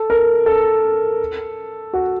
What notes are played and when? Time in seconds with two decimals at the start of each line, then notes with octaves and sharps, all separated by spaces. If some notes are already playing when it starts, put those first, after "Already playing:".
Already playing: A4
0.10 A#4
0.46 A4
1.93 F#4